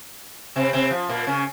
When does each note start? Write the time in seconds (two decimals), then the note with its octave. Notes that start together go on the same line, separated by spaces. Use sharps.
0.56 C3 C4
0.73 C3 C4
0.91 F3
1.08 A#2 A#3
1.27 C#3 C#4